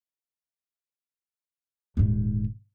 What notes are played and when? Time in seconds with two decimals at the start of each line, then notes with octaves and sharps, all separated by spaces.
1.97 D#1 G#2